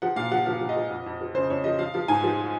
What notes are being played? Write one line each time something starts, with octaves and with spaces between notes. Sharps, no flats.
F3 F#5
A#2 F5
F3 F#5
F3 F5
F3
D#5
F3
F2
F2
F3
C#3 C5
F2 C#5
F3 D#5
F3 F5
F3 F5
G#2 G#5
F3